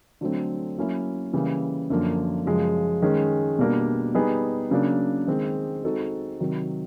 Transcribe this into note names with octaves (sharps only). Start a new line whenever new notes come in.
D3 F#3 A3 C4
F#3 A#3 C#4 E4
C#3 E3 G3 A#3
F#2 D3 F3 A#3
F#2 C#3 F3 G#3
D#3 G#3 C#4
B2 G3 A#3 D4
G3 B3 D#4 G#4
C#3 F#3 A#3 D4
D#3 G#3 C4
G#3 C4 D#4 F#4 A4
C3 D#3 F#3